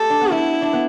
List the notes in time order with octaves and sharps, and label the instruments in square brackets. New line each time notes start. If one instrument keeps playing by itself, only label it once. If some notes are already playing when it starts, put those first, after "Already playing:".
Already playing: [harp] A3 G4 [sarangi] A4
[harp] D4
B3
[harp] A3 [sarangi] E4
[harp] D4
B3